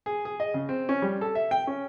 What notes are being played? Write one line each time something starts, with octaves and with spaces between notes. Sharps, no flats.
G#4
G#4
D#5
C#3
C4
C#4
G3
A4
E5
G5
C#4